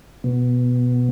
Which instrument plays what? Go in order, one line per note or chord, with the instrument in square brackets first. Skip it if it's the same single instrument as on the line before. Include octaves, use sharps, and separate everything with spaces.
[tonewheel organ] B2